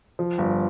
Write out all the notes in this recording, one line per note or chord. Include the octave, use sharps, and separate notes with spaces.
F3
G1